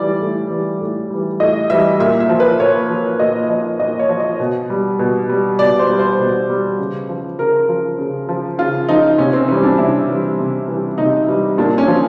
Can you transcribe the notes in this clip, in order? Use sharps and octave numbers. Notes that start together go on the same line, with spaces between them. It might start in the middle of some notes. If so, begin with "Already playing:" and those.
Already playing: A2 E3 G3 D5
A2
E3 G3
A2
E3 G3
A2 D#5
E3 G3 E5
A#2 E5
E5
F3
B4
A#2 C#5
F3
A#2 D#5
F3 D#5
A#2 D#5
C#5
F3
D#5
B2
G3
B2
G3
B2 D5
C5
G3
C5
B2
G3
C#3
F3
C#3 A#4
F3
C#3
F3
C#3 F4
F3 D#4
C3 C#4
C4
E3 G3 C#4
D4
C3 E4
E3 G3
C3
E3 G3
C3 D#4
E3 G3
A#2 D4
C#4
F3